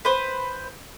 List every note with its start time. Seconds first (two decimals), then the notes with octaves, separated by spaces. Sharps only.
0.05 B4 C5